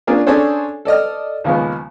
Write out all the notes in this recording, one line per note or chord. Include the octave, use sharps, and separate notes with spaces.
A#3 C#4 D4 F4 G#4 A#4
C#4 D4 G#4 A4 C5 C#5
A4 D5 D#5 F6
D#2 C#3 F3 G#3 B3